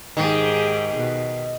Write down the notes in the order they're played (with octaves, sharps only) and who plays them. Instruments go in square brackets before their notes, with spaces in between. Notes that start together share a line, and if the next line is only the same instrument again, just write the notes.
[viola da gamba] G#2 G4 G#4 [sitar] D#3
[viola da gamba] B2